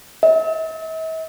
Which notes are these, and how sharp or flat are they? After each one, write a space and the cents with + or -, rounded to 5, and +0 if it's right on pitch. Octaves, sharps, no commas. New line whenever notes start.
E5 -45